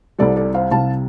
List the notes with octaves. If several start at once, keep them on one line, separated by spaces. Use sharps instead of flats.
C2 C3 G3 A4 D5
A4 D5
C5 F5
C2 C3 G3 F5 A5